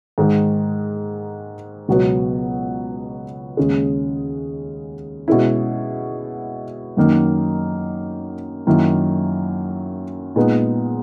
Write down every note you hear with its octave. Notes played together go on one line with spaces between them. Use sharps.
G#2 D#3 G#3 D#4
C#2 B2 F#3 B3
D#2 C#3 G#3
B2 G#3 C#4 E4
F#2 D#3 A#3 D#4
F#2 D#3 A#3 E4
A#2 G#3 B3 D#4